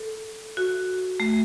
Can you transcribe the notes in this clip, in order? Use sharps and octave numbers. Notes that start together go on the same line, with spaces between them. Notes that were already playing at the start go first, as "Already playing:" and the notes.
Already playing: A4
F#4
A3